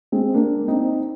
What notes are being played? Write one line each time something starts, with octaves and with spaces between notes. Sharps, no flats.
G#3 C4
A#3 D4
C4 D#4